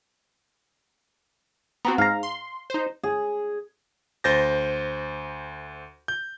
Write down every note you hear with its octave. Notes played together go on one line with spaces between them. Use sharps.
B3 C4 F#4 A#5
G#2 F5 A#5
C6
D#4 C5
G#4
D2 C5 G6 A6 A#6
G6